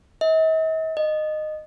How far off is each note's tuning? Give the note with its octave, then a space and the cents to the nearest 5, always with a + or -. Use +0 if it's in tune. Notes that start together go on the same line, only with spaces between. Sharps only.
D#5 +45
D#5 -15